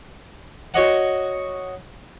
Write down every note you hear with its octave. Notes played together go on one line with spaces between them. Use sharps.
F#4 C#5 D#5 F#5